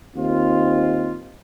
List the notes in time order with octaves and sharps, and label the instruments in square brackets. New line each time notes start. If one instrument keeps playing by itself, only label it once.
[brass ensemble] D#2 C4 D#4 F4